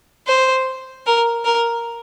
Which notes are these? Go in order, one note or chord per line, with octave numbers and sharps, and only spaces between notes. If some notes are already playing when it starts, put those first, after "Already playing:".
C5
A#4
A#4